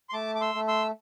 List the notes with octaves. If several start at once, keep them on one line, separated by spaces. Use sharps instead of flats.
C6
A3 A5 D6
D6
C6 E6
A3
C6 E6